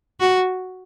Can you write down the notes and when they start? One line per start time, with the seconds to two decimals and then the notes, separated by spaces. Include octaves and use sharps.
0.20 F#4